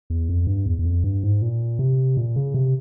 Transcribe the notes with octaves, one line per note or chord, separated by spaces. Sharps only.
E2
F2
G2
E2
E2
F2
G2
G#2
A#2
C3
A#2
C#3
C3